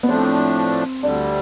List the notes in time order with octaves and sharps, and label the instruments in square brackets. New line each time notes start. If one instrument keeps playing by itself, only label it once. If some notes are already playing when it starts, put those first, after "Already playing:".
[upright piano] B3
[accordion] A2 F3 A3 D4 [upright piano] C4
[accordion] D2 D3 G3 [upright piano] D4